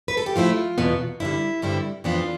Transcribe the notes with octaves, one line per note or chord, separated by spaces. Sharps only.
B4
A4
G4
A2 F3 A3 E4 F4
E2 B2 B3
G2 D3 G3 E4
G2 D3 G3 C4 E4
F2 E3 B3 D4 F4